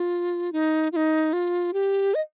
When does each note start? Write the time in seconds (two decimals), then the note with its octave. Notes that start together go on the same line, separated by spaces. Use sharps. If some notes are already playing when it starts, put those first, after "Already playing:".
Already playing: F4
0.52 D#4
0.92 F4
0.96 D#4
1.33 F4
1.73 G4
2.15 D#5